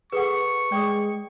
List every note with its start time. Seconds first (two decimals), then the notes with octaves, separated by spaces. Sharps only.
0.13 G#4 A4 B4 F#5 C#6
0.72 G#3 D5 G5 D6 D#6